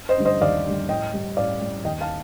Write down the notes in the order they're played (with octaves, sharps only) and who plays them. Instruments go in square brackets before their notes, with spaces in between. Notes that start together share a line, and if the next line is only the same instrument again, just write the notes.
[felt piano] C5 D#5
D3 G3
C5 D#5
D#2 D5 F5
D3 G3
A2 D#5 G5
G3
A2 D5 F5
G3
D#2 D#5 G5
F5 A5